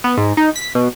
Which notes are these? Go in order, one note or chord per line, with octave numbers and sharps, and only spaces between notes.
B3
G#2
D#4
B6
B2